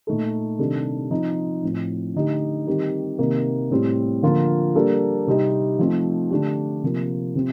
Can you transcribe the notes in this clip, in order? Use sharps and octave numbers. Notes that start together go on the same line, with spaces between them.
A#2 A3 D#4 A4
C3 D#3 G3 D4 A4
F3 C4 D#4
A2 F3 C4
D3 A3 D#4 G4
D#3 G3 C4 G4
C3 D#3 A#3
A2 G3 C4
D3 F3 A#3 F4
G3 A#3 D4 A4
C3 G3 C4 D#4 G4
F3 A3 C4 D#4
D3 A3 D4 G4
C3 F3 A#3
C3 F3 C4